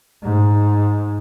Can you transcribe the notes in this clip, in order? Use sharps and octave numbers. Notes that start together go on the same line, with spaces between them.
G#2